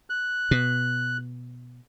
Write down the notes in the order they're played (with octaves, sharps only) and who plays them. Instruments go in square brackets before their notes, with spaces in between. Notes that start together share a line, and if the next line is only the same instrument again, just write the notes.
[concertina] F#6
[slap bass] B2